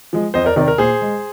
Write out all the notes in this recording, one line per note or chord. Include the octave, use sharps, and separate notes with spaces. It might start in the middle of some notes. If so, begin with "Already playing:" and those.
F3 G#3
F2 C5 D#5
A#4 D5
C3 D#3 A#4 D5
A#4
A#2 G#4 C5
G#3